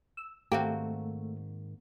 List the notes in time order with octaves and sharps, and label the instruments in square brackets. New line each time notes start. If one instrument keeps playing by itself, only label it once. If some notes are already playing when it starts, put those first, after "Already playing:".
[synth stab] E6
[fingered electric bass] G#2 D#3 [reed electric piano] A3 [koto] A#3 C4 F#4 [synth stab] G4